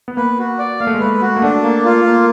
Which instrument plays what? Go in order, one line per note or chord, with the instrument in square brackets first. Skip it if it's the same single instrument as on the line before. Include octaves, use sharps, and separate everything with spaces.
[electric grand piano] B3
[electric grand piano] A#3 [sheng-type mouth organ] B4
[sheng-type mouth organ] F#4
D5
[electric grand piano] A#3 [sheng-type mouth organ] F5
[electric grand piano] A3
G#3
[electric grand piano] A3 [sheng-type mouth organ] B4
[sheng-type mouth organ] F#4
[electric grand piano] A#3
[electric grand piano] A3 [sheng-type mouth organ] D4
[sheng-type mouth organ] A#3
F4
A#3